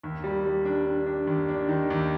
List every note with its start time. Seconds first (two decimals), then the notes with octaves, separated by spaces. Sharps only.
0.03 D#2
0.24 G3
0.45 G3
0.65 D4
0.86 D4
1.07 D4
1.27 D#2
1.49 D4
1.69 D#3
1.90 D#2